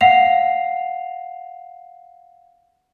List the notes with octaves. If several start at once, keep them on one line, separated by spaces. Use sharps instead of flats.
F5 F#5 C7 F7